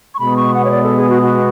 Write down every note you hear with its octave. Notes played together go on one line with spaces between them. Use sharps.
C#6
B2 G#3 B3 B5
C#6
F#5
C#5
D5
A4
G#4
F#4
F#4